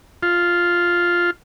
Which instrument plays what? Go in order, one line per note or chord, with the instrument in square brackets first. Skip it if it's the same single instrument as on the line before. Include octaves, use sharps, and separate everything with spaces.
[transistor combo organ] F4